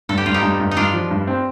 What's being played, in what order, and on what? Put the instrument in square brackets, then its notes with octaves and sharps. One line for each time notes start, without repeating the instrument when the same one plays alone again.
[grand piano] G2 [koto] A4
[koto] G4
[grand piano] G2 [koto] F4
[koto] D#4 G4
[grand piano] G2
G2
[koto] D#4
[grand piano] G2 [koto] D4 F4
[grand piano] F3
G2
C4